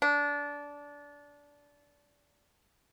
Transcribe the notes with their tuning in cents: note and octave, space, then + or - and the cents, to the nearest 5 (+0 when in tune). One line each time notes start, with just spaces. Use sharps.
D4 -20